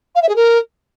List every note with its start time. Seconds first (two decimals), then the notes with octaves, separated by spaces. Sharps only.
0.15 F5
0.22 E5
0.29 G#4
0.36 A#4